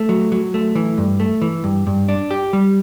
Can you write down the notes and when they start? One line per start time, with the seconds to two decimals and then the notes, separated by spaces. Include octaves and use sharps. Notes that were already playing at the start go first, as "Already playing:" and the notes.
Already playing: A3
0.09 F#3
0.32 F#3
0.54 A3
0.75 E3
0.98 G2
1.20 A3
1.42 E3
1.64 G2
1.87 G2
2.09 D4
2.31 G4
2.53 G3